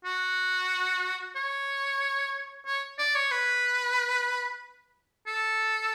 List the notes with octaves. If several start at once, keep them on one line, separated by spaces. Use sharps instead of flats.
F#4
C#5
C#5
D5
C#5
B4
A4